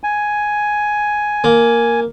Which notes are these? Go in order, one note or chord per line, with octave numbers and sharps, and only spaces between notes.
G#5
A#3